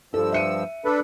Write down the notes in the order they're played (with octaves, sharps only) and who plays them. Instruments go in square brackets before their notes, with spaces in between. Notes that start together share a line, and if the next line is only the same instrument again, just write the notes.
[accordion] G2 F3 E6 [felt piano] A4
[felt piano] E5 C#7 D#7
[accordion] D4 A4 B4